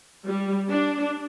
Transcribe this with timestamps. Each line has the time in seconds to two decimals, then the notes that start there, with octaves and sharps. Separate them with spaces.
0.25 G3
0.68 D4